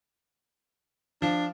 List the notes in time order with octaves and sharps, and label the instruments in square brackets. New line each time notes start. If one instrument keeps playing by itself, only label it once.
[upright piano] F3 [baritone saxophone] D4